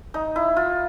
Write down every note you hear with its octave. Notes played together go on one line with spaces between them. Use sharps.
D#4
E4
F4